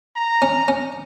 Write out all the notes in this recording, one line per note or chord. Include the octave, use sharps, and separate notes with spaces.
A#5
C#4
C#4